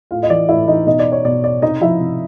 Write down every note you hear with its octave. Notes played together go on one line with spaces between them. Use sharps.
A2 F4 F5
D#5
E3 D5
A2 E4 E5
E3 D#4 D#5
B2 D#4 D#5
D5
C#5
B2 D5
D5
C3 D#4 D#5
F3 E4 E5
C3